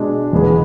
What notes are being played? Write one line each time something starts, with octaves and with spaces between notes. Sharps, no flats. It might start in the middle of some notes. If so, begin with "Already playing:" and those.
Already playing: B2 G#3 D4
E1 E2 C#3 G#3 B3